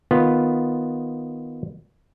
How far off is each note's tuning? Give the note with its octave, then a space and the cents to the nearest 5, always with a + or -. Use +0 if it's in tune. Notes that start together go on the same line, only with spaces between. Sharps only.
D#3 +0 B3 +0 F4 +0